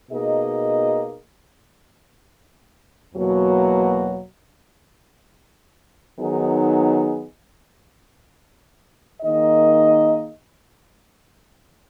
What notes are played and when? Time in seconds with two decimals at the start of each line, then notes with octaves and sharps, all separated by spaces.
0.11 B2 A#3 D#4 G#4 D#5
3.14 E2 B2 F#3 A#3
6.18 D#3 F#3 B3 D#4 G#4
9.22 D#3 A#3 D#4 G#4 D#5